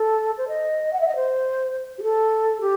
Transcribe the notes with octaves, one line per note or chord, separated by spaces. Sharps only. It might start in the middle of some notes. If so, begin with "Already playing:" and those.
Already playing: A4
C5
D#5
F#5
E5
D#5
C5
G4
A4
G4